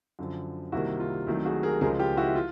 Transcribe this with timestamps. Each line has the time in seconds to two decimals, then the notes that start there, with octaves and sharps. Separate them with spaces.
0.19 F#2 D3 F3
0.72 C2 C3 D#3 G3 A#3 E4 F#4
1.00 F4
1.27 C2 C3 D#3 F#3 A3 E4
1.45 F#4 G#4
1.63 G#4 A#4
1.81 C#2 C#3 F3 G#3 G#4 A#4
1.99 F4 G4
2.17 E4 F#4
2.28 E4
2.35 F4